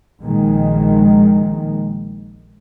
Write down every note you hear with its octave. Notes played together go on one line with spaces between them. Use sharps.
A#1 A#2 D#3 G#3